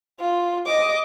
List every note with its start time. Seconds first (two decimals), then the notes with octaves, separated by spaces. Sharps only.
0.20 F4
0.66 D#5 D6